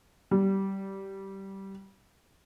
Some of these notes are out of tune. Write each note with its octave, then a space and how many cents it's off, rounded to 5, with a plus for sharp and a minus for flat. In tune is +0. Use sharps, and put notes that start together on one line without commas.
G3 -15